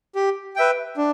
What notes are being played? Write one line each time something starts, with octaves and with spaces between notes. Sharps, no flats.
G4
B4 E5 G5
D4